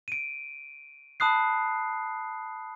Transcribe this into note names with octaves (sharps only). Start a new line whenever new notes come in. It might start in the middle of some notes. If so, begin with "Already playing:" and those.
D7 D#7
A5 B5 D#6 F#6 C7